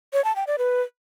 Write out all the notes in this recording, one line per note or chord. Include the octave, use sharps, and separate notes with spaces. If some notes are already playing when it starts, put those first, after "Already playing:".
C#5
A5
G5
D5
B4